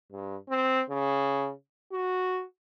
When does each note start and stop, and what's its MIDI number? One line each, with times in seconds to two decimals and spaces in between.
0.12 0.37 43
0.49 0.82 60
0.90 1.51 49
1.92 2.44 66